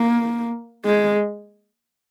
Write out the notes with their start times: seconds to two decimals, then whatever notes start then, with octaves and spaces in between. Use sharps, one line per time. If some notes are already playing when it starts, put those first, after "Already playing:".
Already playing: A#3
0.85 G#3